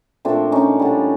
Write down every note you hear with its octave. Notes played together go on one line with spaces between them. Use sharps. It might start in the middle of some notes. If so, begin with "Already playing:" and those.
A#2 F3 A3 C4 D4
C#4 D#4
D3 G3